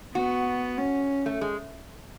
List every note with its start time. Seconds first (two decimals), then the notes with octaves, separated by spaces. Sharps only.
0.15 B3 F#4
0.78 C#4
1.26 A3
1.41 G#3